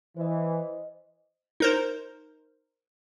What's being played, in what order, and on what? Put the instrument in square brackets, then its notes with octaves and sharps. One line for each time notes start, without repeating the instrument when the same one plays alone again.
[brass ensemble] E3 [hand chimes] C5 D#5
[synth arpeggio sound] D#4 A#4 C5